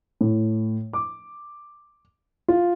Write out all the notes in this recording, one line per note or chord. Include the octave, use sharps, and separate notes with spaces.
A2
D6
F4